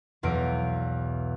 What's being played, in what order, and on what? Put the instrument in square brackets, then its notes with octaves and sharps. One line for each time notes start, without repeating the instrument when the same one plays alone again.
[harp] B1 E2 F5 A#6 D7